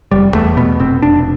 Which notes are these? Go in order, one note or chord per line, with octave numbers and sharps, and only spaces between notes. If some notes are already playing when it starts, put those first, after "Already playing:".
F1 G3
E2 A3
B2 B3
F1 C4
F1 D4